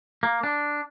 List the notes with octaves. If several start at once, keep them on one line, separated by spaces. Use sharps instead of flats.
A#3
D4